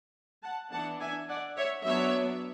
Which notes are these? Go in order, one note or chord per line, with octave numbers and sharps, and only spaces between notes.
F#5 A5
E3 B3 D4 F#5 A5
E5 G#5
D5 F#5
C#5 E5
F#3 B3 D4 C#5 E5